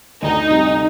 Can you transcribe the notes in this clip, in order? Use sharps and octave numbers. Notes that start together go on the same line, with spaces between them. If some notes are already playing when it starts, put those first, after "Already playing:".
D2 D#4
C3 G3